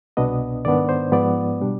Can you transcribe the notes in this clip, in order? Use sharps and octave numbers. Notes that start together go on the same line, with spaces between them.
C2 B2 B3 D4 D#5
G#2 D#3 B3 D4 D5
C5
G#2 F3 B3 D5
B2 G3 D4